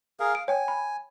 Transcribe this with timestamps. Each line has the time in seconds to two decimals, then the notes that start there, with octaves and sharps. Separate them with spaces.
0.20 G#4 A#4 F5
0.35 F5 D7
0.48 C#5 G5 G#5
0.68 B5